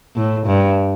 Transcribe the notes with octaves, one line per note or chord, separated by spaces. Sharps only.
A2
G2